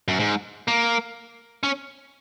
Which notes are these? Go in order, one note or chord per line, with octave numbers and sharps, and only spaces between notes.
F#2
G#2
A#3
C#4